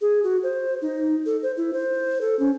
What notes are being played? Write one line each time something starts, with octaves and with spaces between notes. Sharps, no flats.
G#4
F#4
C5
D#4
A4
C5
E4
C5
A4
C#4